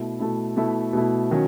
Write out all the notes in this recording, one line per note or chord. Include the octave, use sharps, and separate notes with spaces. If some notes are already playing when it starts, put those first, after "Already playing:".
Already playing: B2 A3 E4
B2 A3 E4
B2 A3 E4
B2 A3 E4
D#3 F#3 C#4